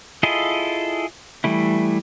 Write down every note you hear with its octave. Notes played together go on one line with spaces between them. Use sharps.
E4 F4 G#4 A4 D#5
E3 G3 A3 E4